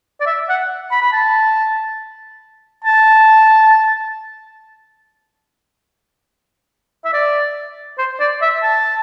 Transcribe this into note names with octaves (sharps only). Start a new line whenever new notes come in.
D5
E5
F#5
B5
B5
A5
A5
E5
D5
C5
D5
E5
A5